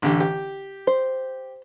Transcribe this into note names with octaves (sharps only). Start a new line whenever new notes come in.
A1 D3 G4
G4
C5